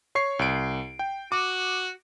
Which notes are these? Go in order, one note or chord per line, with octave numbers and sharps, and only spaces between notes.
C#5 C#6 C7
C2 D7
G5
F#4 D6